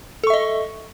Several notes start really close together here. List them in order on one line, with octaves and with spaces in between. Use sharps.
A4 C#6 E5 D#5